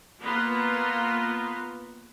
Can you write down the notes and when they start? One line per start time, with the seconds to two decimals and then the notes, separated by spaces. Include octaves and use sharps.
0.22 A#3 B3 F4 B4 A#5 C6